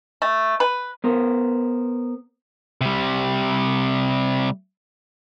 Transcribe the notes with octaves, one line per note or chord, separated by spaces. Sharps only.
A3
B4
B3 A#4 C5
C3 G3